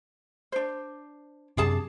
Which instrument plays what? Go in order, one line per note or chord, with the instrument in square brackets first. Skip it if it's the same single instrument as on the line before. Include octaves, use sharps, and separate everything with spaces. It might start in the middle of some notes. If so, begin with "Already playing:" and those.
[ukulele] D4 C5
[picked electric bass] F#2 C3 [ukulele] D4 G#4 A5